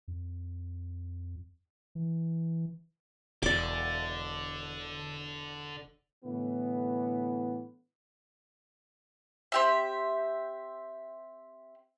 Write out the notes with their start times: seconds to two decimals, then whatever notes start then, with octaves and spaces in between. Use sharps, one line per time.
0.08 F2
1.95 E3
3.42 E1 D3 D5 D6
6.24 A2 D3 E3 B3
9.52 C4 G4 E5